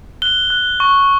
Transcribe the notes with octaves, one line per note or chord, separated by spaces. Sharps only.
F#6 G7
F#6
C#6